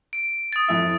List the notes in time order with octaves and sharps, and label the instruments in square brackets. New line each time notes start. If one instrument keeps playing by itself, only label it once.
[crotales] D7
D#6 A6
[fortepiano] F2 E4 E5